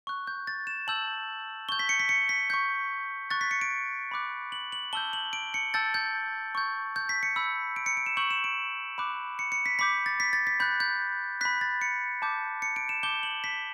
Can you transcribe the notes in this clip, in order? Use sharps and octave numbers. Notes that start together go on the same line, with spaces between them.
C#6 F#6
G6
A6
E7
A5 E6 G6 F#7
C#6 G6 G7
B6
C#7
B6
C#7
B6
C#6 G6
C#6 F#6 A6
B6
C#7
D7
B5 D6 F#6
F#7
F#7
A5 E6 G6 G7
F#7
D7
C#7
A5 E6 G6 A6
G6
C#6 G6
G6
B6
C#7
B5 E6 G6
D7
C#7
D7
E7
C#6 E6 G6 F#7
E7
D7
B5 D6 F#6
C#7
C#7
B6
B5 D6 G6 B6
A6
B6
A6
B6
B5 F#6 G6
G6
B5 F#6 B6
A6
C#7
A5 D6 G6
C#7
D7
E7
A5 D6 G6 G7
F#7
B6